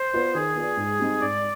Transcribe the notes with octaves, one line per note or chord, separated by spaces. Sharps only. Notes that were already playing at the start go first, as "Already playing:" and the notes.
Already playing: C5
B3 F4 B4 D5
D#3 G#4
B3 F4 B4 D5
G#2
G3 C4 D#4
G#2 D5